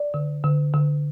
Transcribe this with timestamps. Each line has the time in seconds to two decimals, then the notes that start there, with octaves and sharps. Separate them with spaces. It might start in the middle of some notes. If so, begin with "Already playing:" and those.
Already playing: D5
0.14 D3
0.44 D3
0.74 D3